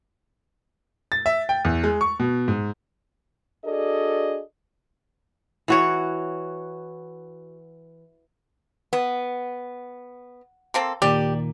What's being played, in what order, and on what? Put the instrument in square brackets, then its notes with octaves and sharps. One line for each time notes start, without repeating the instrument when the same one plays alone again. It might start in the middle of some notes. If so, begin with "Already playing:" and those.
[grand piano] A6
E5
G5
E2
G#3
C#6
B2
G#2
[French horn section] D4 F#4 G#4 A4 D5 D#5
[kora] E3 F#4 C#5
[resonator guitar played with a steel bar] B3
[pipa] A#3 C4 A4
[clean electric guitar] D#2 A#2 D#3 [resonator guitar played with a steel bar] G4 [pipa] D5